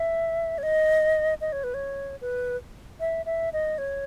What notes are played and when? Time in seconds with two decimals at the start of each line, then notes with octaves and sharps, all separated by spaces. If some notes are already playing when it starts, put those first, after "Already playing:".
Already playing: E5
0.58 C#5
0.63 D#5
1.41 D#5
1.52 C#5
1.64 B4
1.74 C#5
2.21 B4
3.00 E5
3.26 E5
3.53 D#5
3.78 C#5